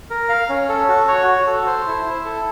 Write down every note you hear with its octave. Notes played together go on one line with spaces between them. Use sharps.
A#4
F5
C#4
A4
F#4
C#5
F#4
A4
C5
E4
E4
A4